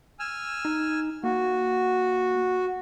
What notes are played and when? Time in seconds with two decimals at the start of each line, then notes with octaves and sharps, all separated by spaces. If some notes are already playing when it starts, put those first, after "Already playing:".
0.19 G#5 E6 F6
0.65 D#4
1.24 A#3 F#4